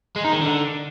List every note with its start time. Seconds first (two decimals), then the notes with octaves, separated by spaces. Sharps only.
0.16 G#3
0.24 D#4
0.33 D#3
0.42 D3